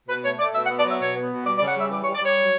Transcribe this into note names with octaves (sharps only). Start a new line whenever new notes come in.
B2 B4
A3 C#5
A3 D5
B2 E5
F#5
B3
D5
F#3 E5
B2 C#5
B3
B2
G3 D5
D5
C#3
F#5
G3 E5
E3 D5
C#5
G3
D5
G3 C#5
F#3